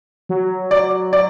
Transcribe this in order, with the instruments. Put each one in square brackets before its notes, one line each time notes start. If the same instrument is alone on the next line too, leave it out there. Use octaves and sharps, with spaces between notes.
[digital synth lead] F#3
[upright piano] D5
D5